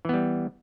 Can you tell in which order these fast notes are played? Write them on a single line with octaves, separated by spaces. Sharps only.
E3 B3 G3